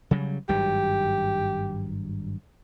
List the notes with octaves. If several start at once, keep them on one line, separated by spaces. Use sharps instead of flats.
C#3 F#3 G3
G#1 G2 F#3 G4